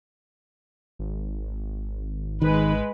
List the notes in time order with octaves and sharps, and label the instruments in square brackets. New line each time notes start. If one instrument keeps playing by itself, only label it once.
[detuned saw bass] G#1
[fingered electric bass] D#3 [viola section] G#3 B4